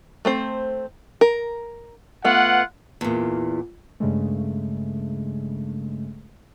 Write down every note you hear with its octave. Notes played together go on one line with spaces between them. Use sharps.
A3 C4 C5
A#4
A3 B3 F4 F#5
E2 A#2
G2 C#3 G#3 A3